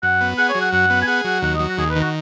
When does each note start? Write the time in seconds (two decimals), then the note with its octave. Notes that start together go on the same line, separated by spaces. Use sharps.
0.03 F#2 F#5
0.21 B3
0.38 G#4 F#5
0.49 C#5
0.55 F#3
0.61 F#5
0.73 F#2 F#5
0.90 B3
1.02 G#5
1.07 G#4 F#5
1.25 F#3 F#5
1.42 D#2 F#5
1.54 D#5
1.60 F#3
1.69 F#4
1.78 D#2 G#4
1.90 B4
1.96 D#3
2.01 F#4